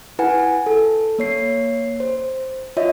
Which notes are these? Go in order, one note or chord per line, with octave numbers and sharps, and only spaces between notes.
E4 B4 F#5 G#5
A4
A#3 C#5 C7
C5
F4 C#5 D#5 E5